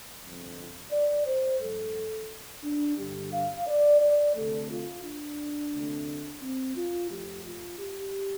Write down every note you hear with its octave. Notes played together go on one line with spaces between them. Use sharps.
G1 F2 C3
D5
C5
G2 F3 A3 A4
D4
G2 D3 G3 G4
F5
D5
D5
D2 C3 A3 A4
F4
D4
D2 C3 A3
C4
F4
F2 F3 A3 G4
F4
G4